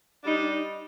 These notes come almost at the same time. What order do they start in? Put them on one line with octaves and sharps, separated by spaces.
D4 G3 D#4